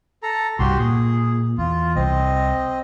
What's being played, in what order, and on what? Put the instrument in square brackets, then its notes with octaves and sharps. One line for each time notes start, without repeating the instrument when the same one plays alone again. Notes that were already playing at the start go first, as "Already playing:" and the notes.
[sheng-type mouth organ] A4 A#5
[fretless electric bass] C2 G2 [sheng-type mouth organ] F#4 G4 C6
[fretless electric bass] A#2 [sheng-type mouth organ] G#4
[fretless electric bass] E2 [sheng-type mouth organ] F4
[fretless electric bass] C2 [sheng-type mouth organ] C4 D#5